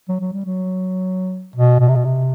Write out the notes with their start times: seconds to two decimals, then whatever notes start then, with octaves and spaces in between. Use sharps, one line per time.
0.09 F#3
0.20 F#3
0.33 G3
0.45 F#3
1.56 B2
1.80 B2
1.88 C3
1.95 B2
2.05 C3